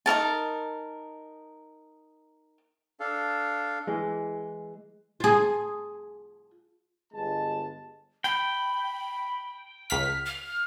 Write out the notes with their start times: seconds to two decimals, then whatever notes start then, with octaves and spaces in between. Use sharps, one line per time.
0.06 D#4 F#4 A#4 A5
3.00 D4 A4 F5
3.87 E3 G#3
5.20 F4 G#4
7.13 G1 G#3 A5
8.24 G5 B5
9.90 C#2 F6 B6
10.26 F6